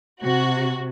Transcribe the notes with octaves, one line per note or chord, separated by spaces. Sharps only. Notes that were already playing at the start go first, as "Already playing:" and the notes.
C3 F#4